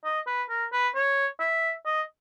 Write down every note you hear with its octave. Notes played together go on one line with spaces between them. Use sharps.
D#5
B4
A#4
B4
C#5
E5
D#5